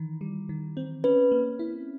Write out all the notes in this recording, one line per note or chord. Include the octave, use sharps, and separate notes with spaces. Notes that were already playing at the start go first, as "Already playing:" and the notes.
Already playing: D#3 E3
G3
D#3
C4
C#4 B4
A#3
E4